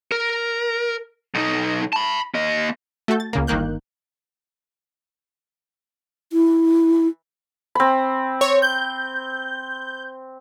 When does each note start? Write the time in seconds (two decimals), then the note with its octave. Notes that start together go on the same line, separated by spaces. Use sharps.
0.12 A#4
1.35 B1 D#4
1.93 A5 B5
2.35 A#3 D#5
3.08 A3 F#4 A4 G6
3.20 A6
3.33 C#2 C#3 A#3
3.47 G1 D#3 A#3 F#6 G6
6.33 E4
7.75 C4 B5
8.41 C#5
8.62 G6